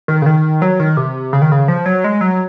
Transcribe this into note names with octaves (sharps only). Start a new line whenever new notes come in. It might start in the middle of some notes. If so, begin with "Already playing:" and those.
D#3
C#3
D#3
F#3
D#3
C3
C#3
D#3
C#3
F3
F#3
G#3
F#3